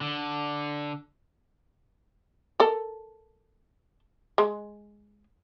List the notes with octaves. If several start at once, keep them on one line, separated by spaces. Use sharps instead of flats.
D3
A4 A#4
G#3